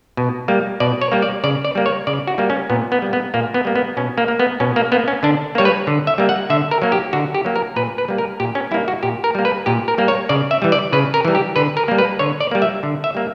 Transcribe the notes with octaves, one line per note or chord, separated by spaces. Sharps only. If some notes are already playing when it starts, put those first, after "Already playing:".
B2
G3 A#3
B2 D5
C#5
G3 A#3
D5
C#3 D5
D5
G3 A#3
C#5
C#3 D5
F#4
G3 A#3
C#4
A#2 B3
B3
G3 A#3
B3
A#2 A#3
B3
G3 A#3
B3
B2 C#4
A#3
A#3
B3
B2 C#4
A#3
A#3 B3
C#4
D3 D4
G3 A#3 C#5
B4
D3
E5
G3 A#3
F#5
D3 E5
A#4
F#3 A#3
G4
D3 F#4
G4
F#3 A#3
A#4
A#2 B4
B4
G3 A#3
A#4
A#2 G4
C#4
G3 A#3 E4
F#4
A#2 G4
A#4
G3 A#3
B4
A#2 G4
A#4
G3 A#3
C#5
C#3 D5
E5
E3 G3
D5
C#3 B4
A#4
E3 G3
G4
D3 B4
A#4
G3 A#3
B4
D3 C#5
D5
G3 A#3
E5
D3
E5
G3 A#3